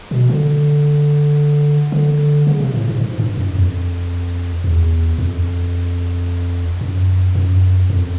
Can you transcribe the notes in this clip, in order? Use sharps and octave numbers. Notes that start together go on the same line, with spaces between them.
B2
D3
D3
C#3
C3
A2
G#2
G#2
G2
F#2
F2
E2
F2
F#2
F#2
F2